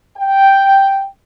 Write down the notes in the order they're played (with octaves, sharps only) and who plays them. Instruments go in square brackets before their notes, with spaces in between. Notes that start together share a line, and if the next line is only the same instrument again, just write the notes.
[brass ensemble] G5